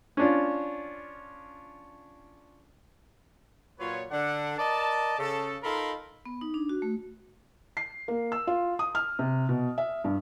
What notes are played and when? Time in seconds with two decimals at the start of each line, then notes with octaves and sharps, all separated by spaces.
0.17 C#4 D4 F4
3.80 A#2 F#3 F4 B4 C#5
4.11 D3 D4 F#5
4.58 A#4 D5 D#5 A5
5.19 C#3 A4
5.63 D#4 F4 A4 A#4 B5 C6
6.25 B3
6.41 D#4
6.54 D4
6.69 F#4
6.82 A3
7.77 C7
8.08 A#3
8.32 E6
8.47 F4
8.79 D#6
8.95 F6
9.19 C3
9.49 B2
9.78 E5
10.04 G2